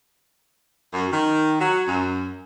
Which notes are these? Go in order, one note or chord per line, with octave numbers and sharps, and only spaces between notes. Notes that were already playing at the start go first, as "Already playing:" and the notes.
F#2
D#3
F#3
F#2